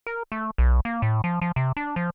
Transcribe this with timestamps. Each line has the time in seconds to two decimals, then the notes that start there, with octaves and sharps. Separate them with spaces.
0.07 A#4
0.32 A3
0.58 B1
0.85 A#3
1.02 A2
1.24 F3
1.42 F3
1.56 C3
1.77 D4
1.96 F3